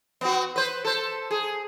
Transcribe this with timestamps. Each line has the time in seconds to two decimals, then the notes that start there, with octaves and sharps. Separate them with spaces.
0.21 B3 C4 F#4
0.56 B4 C5
0.85 A4 C5
1.31 G#4